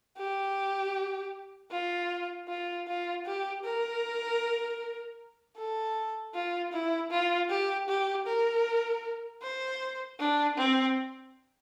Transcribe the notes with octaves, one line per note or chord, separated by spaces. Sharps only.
G4
F4
F4
F4
G4
A#4
A4
F4
E4
F4
G4
G4
A#4
C5
D4
C4